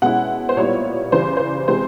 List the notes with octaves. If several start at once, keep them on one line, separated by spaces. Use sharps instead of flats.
B2 G#3 C#4 E4 F#5
C5
A#2 G3 B3 E4 C#5
C#3 E3 G3 C5
C5
C3 E3 G#3 C4 C5